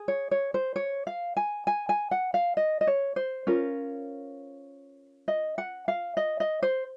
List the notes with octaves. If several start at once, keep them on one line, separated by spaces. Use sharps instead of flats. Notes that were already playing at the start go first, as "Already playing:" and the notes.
Already playing: G#4
C#5
C#5
C5
C#5
F5
G#5
G#5
G#5
F#5
F5
D#5
D#5
C#5
C5
C#4 F4 A#4
D#5
F#5
F5
D#5
D#5
C5